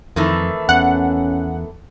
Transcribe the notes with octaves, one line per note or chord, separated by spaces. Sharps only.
F2 D#3 E3 A3
E2 C#4 F#5